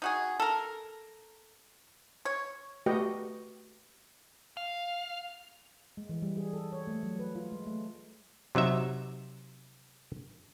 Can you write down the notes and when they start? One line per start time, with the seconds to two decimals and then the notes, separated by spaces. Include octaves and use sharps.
0.02 D#4 F#4 G#4
0.40 A4 A#4
2.25 C#5
2.86 A3 F#4 G4 B4 D#5 G5
4.57 F5
5.97 G#3
6.09 E3
6.22 G3
6.37 G#4
6.53 A4
6.72 C#5
6.87 A3
7.03 F#3
7.19 B4
7.35 F4
7.52 G#3
7.67 A3
8.55 C3 F#3 D#4 E5